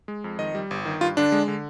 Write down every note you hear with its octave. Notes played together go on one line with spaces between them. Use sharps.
G#3
F2
D#3 D#5
G3
G1
D#3
G2 F4
D3 D4
G#3
D3